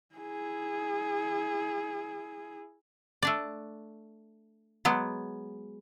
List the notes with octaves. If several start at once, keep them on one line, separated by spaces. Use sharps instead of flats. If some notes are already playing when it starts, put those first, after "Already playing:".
E4 G#4
A3 D4 D5
F#3 G#3 B3